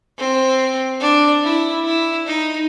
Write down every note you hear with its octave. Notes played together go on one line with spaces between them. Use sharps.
C4
D4
E4
E4
D#4